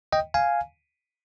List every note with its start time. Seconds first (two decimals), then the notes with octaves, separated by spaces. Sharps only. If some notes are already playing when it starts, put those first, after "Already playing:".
0.12 D#5 G5
0.34 F5 G#5